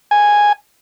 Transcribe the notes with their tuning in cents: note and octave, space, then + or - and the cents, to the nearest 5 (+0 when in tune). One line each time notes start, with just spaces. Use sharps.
G#5 -5